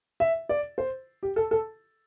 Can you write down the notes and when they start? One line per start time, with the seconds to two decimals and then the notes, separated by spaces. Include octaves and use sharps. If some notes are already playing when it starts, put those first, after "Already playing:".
0.20 E5
0.49 D5
0.78 C5
1.23 G4
1.36 A4
1.51 A4